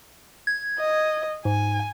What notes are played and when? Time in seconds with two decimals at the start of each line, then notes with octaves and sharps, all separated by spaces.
0.47 G#6
0.79 D#5
1.45 G#2 G#5